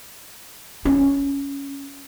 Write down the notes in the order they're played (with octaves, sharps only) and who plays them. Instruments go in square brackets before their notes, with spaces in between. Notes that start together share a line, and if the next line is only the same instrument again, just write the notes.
[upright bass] C#4